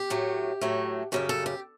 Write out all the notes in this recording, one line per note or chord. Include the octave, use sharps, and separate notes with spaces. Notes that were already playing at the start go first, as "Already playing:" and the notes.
Already playing: G4
A2 F#3 A3
A2 F#3 A3
F#2 C#3 G3 G4
A4
G4